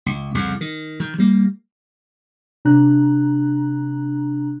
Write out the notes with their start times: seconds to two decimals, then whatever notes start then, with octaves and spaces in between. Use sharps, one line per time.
0.06 C#2
0.35 C2 F2 C#3
0.61 D#3
1.00 D#3
1.18 G3 A#3
2.65 C3 D4 A#5 F#6